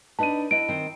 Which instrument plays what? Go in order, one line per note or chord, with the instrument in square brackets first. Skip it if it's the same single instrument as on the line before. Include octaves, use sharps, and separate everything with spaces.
[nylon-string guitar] D4 D#4 B4 [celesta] A5 D#7
[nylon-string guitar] E4 D#5 F#5 [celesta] D7
[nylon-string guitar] D#3 C4 G5